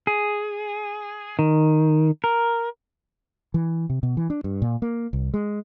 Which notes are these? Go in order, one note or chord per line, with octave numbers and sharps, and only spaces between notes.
G#4
D#3
A#4
E3
C3
B2
E3
D4
G2
A#2
A#3
C2
G#3